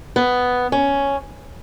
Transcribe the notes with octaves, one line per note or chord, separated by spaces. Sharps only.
B3
C#4